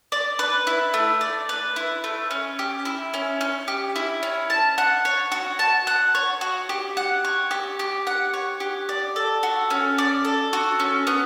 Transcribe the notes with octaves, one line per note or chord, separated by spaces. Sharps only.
D5
B4
E4
A3
D5
B4
E4
A3
C#4
G4
E4
C#4
C#4
G4
E4
C#4
A5
F#5
C#5
F#4
A5
F#5
C#5
F#4
G4
F#5
C#5
G4
G4
F#5
C#5
G4
D5
A4
F#4
C#4
D5
A4
F#4
C#4
B3